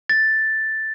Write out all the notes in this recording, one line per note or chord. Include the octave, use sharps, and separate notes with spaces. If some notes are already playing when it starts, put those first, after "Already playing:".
A6